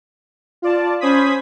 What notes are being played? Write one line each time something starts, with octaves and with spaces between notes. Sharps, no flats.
F4 D5 A5
C#4 C5 B5 D#6 G#6 B6